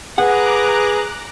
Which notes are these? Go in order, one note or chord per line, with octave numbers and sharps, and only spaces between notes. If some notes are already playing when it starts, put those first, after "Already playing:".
G#4 B4 F#5 A#5 D6 F#6